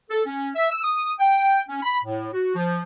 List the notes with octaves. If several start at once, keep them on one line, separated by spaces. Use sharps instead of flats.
A4
C#4
E5
E6
D#6
G5
C#4
B5
A2
F#4
F3